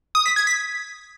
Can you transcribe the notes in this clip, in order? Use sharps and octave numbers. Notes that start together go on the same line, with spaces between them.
D#6
B6
G#6
B6